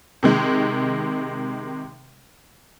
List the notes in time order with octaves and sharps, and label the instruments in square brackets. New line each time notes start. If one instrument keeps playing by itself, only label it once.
[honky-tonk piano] C3 D#3 G#3